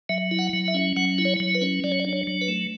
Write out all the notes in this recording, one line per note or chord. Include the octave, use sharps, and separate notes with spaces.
F#3 E5
E4
F#5
F#3
E5
C#4
F#3 F#5
E4
C#5
F#3
B4
C#4
F#3 D5
C#5
D5
D4
C#5
F#3
B4
A3